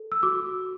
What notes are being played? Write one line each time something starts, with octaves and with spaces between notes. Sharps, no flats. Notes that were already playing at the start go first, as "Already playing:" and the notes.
Already playing: A4
E6
F#4 D6